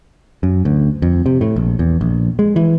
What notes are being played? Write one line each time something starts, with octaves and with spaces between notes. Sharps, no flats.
F#2
D2
F2
C3
A2
A#1
E2
A#1
G#3
E3